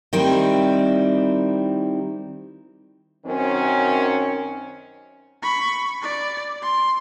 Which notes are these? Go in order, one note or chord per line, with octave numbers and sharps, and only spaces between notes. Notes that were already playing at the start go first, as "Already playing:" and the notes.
D#3 G3 C4 E4
F#2 D#3 C4 C#4
B5 C#6
D5
C6